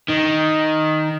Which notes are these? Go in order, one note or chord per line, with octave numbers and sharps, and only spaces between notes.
D#3